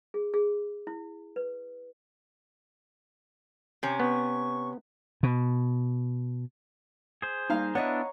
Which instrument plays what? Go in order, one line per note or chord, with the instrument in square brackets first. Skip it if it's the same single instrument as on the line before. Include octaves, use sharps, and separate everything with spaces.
[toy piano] G#4
G#4
E4
B4
[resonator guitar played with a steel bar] C3 C#4
[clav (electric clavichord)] B3 [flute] C#6
[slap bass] B2
[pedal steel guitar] G#4 C5
[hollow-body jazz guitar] G3 A#3 D#4 [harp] F5 A#5
[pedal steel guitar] B3 D4 E4 [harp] C#5 [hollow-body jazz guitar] D#5 F#5